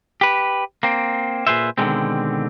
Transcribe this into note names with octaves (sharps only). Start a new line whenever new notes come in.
G4 B4
A#3 C4
A#2 G#4 B4 C5 E5
B2 D3 D#3 G3 G#3 C4